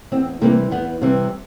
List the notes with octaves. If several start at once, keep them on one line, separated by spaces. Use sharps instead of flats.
E2 C4
C3 E3 G3 A#3
E2 B3
C3 E3 G3 C4